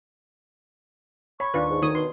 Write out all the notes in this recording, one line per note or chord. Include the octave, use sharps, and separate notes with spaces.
C#5 B5 C#6
D#2 D4 F4 B4
G#2
D2 D#3 C#5 D#6
B2 C6